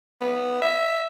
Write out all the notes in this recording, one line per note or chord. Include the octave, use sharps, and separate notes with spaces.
B3
E5